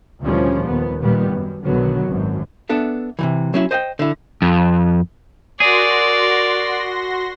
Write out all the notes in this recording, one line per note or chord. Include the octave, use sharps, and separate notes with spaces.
D2 A#2 D#3 F3 G3 C#4
D#2 B3
A#2 D#3 G3 B3
F#2
B1 D3 D#3 F#3 B3
G#1 F#2
B3 D4 A4 E5
C3 D#3 E3
F#3 C#4 E4
C5 D#5 F5 G5
D3 E4
F2
F#4 G#4 A#4 D5 C6 A#6